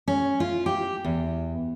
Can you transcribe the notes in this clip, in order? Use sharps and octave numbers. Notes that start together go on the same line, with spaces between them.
C#4
F4
G4
E2